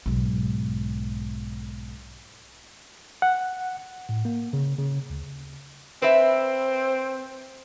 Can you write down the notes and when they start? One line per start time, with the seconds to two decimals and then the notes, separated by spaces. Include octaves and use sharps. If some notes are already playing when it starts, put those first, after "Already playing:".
0.06 B1 G#2
3.22 F#5
4.09 A2
4.25 A#3
4.53 C#3
4.79 C#3
5.10 D2
6.02 C4 B4 E5